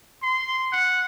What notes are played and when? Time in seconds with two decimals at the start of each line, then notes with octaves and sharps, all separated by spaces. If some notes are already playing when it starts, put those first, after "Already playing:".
0.23 C6
0.72 F#5